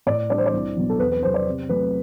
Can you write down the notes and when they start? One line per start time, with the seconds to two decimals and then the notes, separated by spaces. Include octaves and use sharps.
0.06 A2 D5
0.30 G3 D4 D5
0.38 C5
0.46 D5
0.53 C2
0.77 B2 F#3
0.90 A4
0.99 E2 B4
1.12 B4
1.23 C3 F#3 B3 C5
1.34 D5
1.47 C3
1.69 F#3 A3 C4 B4